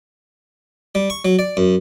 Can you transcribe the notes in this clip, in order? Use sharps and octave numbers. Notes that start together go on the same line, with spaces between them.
G3
C#6
F#3
D5
F#2